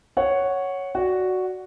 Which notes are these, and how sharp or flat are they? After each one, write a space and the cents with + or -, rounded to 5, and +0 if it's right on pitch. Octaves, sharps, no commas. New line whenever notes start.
C#5 +0 F#5 +0
F#4 +0 D5 -5